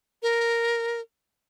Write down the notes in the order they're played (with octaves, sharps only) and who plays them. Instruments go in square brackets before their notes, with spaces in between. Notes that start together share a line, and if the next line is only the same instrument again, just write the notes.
[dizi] A#4